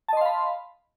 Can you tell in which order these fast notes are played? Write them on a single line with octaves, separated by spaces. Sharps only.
A5 D#5 C6 F5 B5